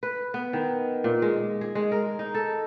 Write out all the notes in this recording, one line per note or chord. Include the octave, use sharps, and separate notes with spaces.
B4
B3
D#3
A#2
G#3
G#4
G#3
A#4
D#4
A4